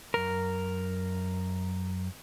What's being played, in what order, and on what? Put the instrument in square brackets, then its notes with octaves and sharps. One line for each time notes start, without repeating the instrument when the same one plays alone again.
[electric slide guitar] F#2 A#4